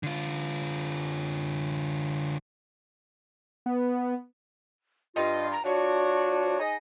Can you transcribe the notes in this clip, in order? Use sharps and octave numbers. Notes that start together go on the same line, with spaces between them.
D3 F4
B3
G2 F4 D#5
A#5
F3 D4 F#4 C#5
D#4 G#4 D#5